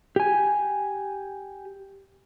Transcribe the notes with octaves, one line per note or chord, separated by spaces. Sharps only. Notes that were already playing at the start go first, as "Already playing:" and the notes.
G4 G#5